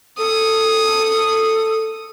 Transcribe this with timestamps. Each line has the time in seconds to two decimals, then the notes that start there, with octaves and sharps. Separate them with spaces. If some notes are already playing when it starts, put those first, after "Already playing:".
0.18 A4 D#6